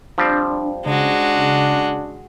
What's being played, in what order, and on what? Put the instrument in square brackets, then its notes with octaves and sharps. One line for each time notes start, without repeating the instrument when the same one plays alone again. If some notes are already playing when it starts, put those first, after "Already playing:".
[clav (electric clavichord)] F3 G3 C4 [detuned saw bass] D4
[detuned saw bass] C#3 [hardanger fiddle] G#3 F#4 [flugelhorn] D4